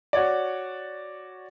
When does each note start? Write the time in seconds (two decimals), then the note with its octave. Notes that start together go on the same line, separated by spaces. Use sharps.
0.13 F#4 C#5 D5